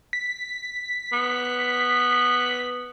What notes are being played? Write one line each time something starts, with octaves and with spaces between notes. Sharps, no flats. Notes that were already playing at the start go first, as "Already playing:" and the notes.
B6
B3